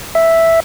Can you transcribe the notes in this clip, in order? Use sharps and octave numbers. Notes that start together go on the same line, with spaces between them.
E5